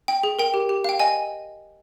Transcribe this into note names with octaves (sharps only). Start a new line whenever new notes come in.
G5
G#4
A#4 G5
G4
G4
F5 G5
D#5 G#5